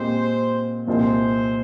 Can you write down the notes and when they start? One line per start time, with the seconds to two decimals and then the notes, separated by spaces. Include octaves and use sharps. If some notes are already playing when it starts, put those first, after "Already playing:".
Already playing: A#2 G#3 C4 G4 C5
0.87 C2 A#2 F3 G#3 C4 C5